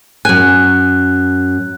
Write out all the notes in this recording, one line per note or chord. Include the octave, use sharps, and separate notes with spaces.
F#2 G#5 F#6